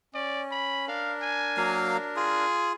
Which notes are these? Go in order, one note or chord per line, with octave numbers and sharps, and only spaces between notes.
C#4 D5
B5
D4 A#4 F5
G#5
F#3 A#3 F5
F4 G#4